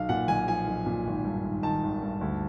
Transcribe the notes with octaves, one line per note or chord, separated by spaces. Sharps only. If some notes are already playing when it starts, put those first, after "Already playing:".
Already playing: B1 F5
A#2 F#5
B1 G#5
F3 G#5
B1
A#2
G#1
G2
G#1
D#3 A5
G#1
G2
D2